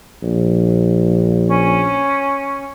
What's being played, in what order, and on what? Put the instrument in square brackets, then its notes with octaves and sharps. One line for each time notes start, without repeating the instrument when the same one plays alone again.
[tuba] A#1
[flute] C#4